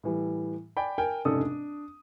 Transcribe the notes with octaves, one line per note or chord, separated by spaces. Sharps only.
A2 E3 G3
D5 G5 G#5 B5
A#4 G5 G#5
F1 G#2 C#3 A4 D5 D#6
D4